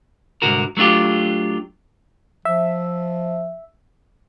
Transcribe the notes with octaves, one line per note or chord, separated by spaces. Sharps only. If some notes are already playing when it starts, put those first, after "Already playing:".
C2 G#2 D3 F#4 A#4
F#3 A3 D4 F4 G4
F3 E5